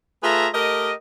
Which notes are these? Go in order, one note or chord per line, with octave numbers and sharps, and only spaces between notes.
A3 F4 G#4 B4 E5 A#5
A3 G4 A#4 D#5